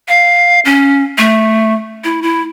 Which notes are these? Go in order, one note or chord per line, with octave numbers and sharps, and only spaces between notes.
F5
C#4
A3
E4
E4